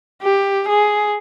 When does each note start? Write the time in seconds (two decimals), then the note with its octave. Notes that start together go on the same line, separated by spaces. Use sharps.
0.23 G4
0.68 G#4